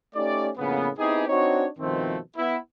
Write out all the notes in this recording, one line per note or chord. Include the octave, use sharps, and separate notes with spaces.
A3 C#4 D#4 G4 D5
F2 A2 C#3 A#3 B3
B3 C4 D#4 E4 G4 G#4
C4 D4 D#4 F#4 C#5
G2 B2 D#3 F3 A3 C4
B3 E4